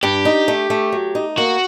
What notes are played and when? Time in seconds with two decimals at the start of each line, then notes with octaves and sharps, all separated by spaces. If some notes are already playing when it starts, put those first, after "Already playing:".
0.03 G2 G4
0.25 D#4
0.48 A3
0.70 A3
0.92 F#3
1.15 D#4
1.37 A#3 F#4